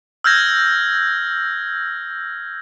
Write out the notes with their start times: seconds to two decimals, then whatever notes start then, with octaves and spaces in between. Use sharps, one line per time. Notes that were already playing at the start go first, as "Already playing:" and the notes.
0.24 E6 F6 G6 G#6 A#6